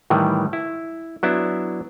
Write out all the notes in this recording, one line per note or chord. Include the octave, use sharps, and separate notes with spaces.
A2 D#3 E3 G3
E4
F#3 B3 D4 E4 E5